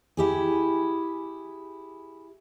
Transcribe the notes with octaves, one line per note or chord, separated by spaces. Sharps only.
E4 G4 G#4